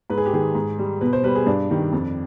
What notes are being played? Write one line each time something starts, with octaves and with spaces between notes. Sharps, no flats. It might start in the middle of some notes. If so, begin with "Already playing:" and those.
G#2 B4
G#4
G4
D#3 G#3 G#4
G#2
G3
B2 B4
C5
G3 B4
G#4
G2 D4
D#3 G3
F2